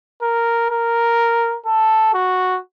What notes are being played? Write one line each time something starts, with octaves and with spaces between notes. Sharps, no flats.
A#4
A#4
A4
F#4